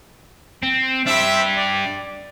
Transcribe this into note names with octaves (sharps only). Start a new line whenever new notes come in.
C4
D4 G4 C5 E5
D5